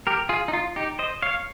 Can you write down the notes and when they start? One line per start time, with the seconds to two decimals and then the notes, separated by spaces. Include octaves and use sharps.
0.07 G4 A#4
0.29 F4 G#4
0.48 D#4
0.53 F4
0.76 D#4 G4
0.99 C5 D#5
1.22 C#5 F5